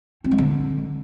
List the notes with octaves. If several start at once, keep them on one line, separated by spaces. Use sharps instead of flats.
C4
G#3
D3